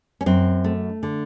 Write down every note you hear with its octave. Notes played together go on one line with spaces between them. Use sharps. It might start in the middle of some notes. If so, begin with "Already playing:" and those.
C#4
F#2 C4
A3
D3